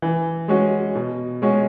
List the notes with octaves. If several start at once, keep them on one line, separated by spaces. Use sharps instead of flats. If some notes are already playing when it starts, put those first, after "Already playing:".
E3
G#3 C#4 F#4
B2
G#3 C#4 F#4